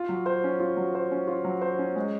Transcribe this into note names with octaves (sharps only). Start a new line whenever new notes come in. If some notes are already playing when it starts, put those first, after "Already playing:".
Already playing: F4
F#3
C5
C#4
F4
F#3
C5
C#4
F4
F#3
C5
C#4
G#3